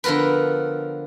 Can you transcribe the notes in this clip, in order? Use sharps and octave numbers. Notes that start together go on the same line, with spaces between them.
D3 F3 B3 A#4 B4